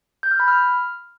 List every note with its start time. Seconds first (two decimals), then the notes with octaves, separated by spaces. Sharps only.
0.23 G6
0.31 F6
0.40 B5
0.48 F6